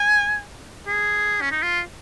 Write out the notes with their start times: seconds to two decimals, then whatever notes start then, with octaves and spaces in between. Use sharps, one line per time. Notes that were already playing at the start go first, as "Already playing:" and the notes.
Already playing: G#5
0.87 G#4
1.41 C#4
1.51 D#4
1.62 F4